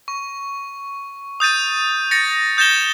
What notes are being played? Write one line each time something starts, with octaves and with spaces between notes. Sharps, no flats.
C#6
D#6 G6 A6 D#7
A6 A#6 C#7
D#6 G6 A6 A#6 E7 G7